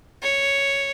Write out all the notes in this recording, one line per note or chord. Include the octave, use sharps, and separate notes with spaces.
C#5